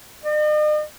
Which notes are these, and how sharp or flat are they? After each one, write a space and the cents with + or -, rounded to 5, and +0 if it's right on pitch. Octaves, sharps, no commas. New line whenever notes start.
D#5 -45